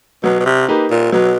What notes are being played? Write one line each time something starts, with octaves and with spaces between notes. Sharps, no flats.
B2 F#3
B2
C3
A#3 D#4 G4 B4
A#2
B2 F#3